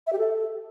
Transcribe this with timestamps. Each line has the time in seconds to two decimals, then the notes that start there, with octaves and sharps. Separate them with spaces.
0.07 E5
0.13 G4
0.18 A4